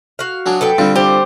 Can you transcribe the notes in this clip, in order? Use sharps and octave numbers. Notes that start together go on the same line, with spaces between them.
F#4 F5
F#3 D4 G#4
A4 B4 G5
D3 G3 C4 F4
G4 C5